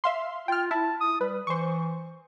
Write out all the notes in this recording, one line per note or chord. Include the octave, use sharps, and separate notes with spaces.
E5 F5 C6
F4 G5 F6
E4 A5
D#6
G3 B4
E3 C5 C#6